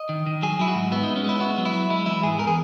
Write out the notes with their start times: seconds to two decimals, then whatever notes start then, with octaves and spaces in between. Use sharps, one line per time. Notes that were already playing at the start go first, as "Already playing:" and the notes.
Already playing: D#5
0.09 D#3
0.26 D#3
0.42 F#3 G#4
0.59 F#3 E4
0.68 F#4
0.75 G#2
0.92 B3 E4
1.03 G#3 D#4
1.16 C#4
1.24 G#3 E4
1.40 B3 F#4
1.58 F#3
1.65 E4
1.73 F#3
1.90 G#3 E4
2.06 E3 E4
2.23 G#2 G#4
2.39 E2 A#4
2.47 G#4